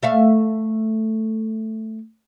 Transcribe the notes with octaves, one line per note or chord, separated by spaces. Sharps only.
A3 E5 F5